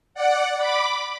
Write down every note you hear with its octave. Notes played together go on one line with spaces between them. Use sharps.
D5 F#5
B5 D6